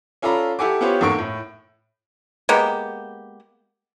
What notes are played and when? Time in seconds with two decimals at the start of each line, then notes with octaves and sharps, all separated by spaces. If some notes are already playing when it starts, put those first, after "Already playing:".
0.22 C#4 F4 A4 D5 A#5 B5
0.59 E4 G4 A4 F#5 G#5 D6
0.81 B3 E4 F4 G4 C5 C#5
1.01 E2 G#2 A#3 A4 C#6 D7
1.19 A2
2.49 G#3 A#3 B3 G4